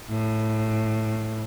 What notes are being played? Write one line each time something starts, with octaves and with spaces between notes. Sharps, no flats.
A2